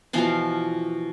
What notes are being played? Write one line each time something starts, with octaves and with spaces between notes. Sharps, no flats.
B2 E3 F3 F5